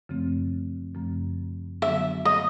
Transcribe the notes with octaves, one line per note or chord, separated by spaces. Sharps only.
F#2 C#3 F3 A3 C4
F#2 C#3 F3 A3 C4
D3 F#3 B3 D4 F#4 E5
D#5